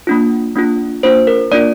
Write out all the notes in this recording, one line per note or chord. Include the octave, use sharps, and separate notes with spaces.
A#3 D4 F4
A#3 D4 F4
A#3 D4 F4 C5
A#4
A#3 D4 F4 D5